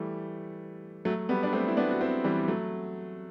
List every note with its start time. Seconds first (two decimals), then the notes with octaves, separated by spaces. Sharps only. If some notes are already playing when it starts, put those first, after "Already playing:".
Already playing: E3 G3 A3
1.05 F#3 A3
1.29 G3 B3
1.43 D4
1.53 A3 C4
1.68 E4
1.77 B3 D4
1.91 F#4
2.01 C4 E4
2.24 E3 G3
2.48 F#3 A3